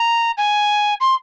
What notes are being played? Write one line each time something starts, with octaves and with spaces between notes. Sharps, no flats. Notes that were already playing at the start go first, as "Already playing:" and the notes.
Already playing: A#5
G#5
C6